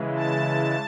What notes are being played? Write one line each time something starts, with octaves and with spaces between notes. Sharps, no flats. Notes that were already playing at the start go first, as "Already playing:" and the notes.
Already playing: C#3 E3 G#3
A5